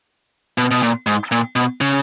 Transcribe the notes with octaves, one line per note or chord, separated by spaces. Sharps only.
B2
B2
A#2
G#2
A#2
B2
C#3